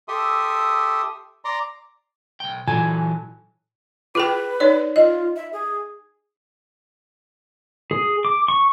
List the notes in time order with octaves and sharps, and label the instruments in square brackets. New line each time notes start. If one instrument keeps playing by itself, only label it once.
[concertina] G4 A4 E5 C6 D#6
D5 A#5 C6
[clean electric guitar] B1 G5
[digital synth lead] A#2 [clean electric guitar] E3 F#3 A4 [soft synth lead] G#5
[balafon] F4 G#4 G5 [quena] B4
[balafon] D#4 C#5 D5
[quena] F4 [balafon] D#5
[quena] E5
G#4
[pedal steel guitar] G#4
D6
C#6